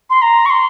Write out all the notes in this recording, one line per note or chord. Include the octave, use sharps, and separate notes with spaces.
C6
A#5
C#6
C6